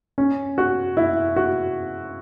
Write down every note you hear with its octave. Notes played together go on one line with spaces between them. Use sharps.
C#4
F#4
E4
F#4